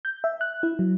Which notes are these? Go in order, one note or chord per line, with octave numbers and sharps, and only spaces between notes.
G6
E5
F#6
E4
F#3